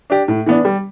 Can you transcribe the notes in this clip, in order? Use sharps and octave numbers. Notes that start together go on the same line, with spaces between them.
D4 G4
A2
E3 B3 D4
G3